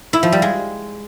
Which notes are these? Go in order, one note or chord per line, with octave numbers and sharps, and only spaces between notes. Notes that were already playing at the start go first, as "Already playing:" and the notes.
E4
F3
G3
G#3